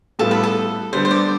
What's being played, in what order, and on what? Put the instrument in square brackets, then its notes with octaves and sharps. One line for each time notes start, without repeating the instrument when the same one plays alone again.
[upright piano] A2 G3 B3 F4 [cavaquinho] A4
[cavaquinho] B4
A4
[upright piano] D3 G3 B3 D4 [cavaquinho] C5
[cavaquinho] C5
D5